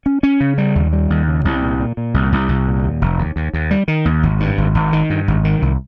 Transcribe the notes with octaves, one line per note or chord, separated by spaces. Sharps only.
C#4
C#4
C#3
G3
D#2
G3
D#2
C#3
C2
A#2
A#2
A#2
C2
C2
C2
A#2
D#2
F1
D#2
D#2
D#2
G3
D#3
D#2
G#1
G2
G#1
G#1
D#3
G2
G#1
D#3
C2